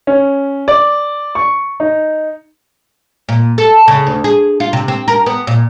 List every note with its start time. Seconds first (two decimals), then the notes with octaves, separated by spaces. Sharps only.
0.07 C#4
0.68 D5
1.35 C#6
1.80 D#4
3.29 A#2
3.58 A4
3.88 C#3
4.07 D2
4.24 G#4
4.60 F4
4.73 C3
4.88 C4
5.08 A#4
5.26 B3
5.47 A#2